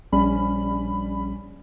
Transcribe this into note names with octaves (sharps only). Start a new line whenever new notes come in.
A#1 G3 C#4 B5